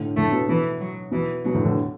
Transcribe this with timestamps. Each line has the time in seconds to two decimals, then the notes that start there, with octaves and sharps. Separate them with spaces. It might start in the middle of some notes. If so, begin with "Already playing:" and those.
Already playing: A2 D3
0.17 A2 D3 A3
0.32 B2
0.49 B2 E3
0.80 F#3
1.12 B2 E3
1.44 B2 F#3
1.54 A2 D3
1.65 A2 D3